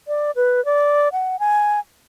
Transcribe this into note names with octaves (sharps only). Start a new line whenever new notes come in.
D5
B4
D5
F#5
G#5